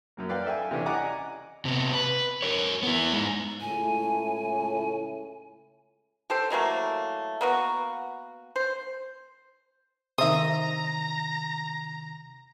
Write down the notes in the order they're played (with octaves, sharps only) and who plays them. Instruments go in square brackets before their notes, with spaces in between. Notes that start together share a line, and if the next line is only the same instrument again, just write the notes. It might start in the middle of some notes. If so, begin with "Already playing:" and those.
[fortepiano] F#2 F#3 A#3
B4 D5 F5 G5
A4 E5 G5 G#5
C3 E3 C#4 D4
D5 D#5 F#5 G#5 A#5 D6
[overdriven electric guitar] C3 B3
B4
A#4 C#5
B3 E4
G#3 D#4
[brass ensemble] C#2 A2 [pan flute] G#5
[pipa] G4 A4 C5
E3 F#3 A3 A#3
A#3 B3 F#4
C5
[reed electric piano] C3 D#3 [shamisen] C5 E5 [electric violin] A#5 [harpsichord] D#6